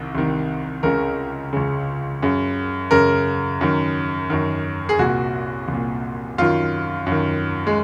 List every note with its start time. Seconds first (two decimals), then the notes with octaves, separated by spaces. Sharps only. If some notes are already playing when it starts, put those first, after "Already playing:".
Already playing: C2 C3 D#3
0.15 C2 C3 D#3
0.83 C#2 C#3 A#4
1.53 C#2 C#3
2.22 F#2 C#3
2.91 F#2 C#3 A#4
3.61 F#2 D#3
4.30 F#2 D#3
4.89 G#4
4.99 C2 A#2 F#4
5.68 C2 A#2
6.38 F#2 D#3 F4
7.06 F#2
7.12 D#3
7.67 G#3